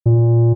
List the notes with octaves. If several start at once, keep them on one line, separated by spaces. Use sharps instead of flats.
A#2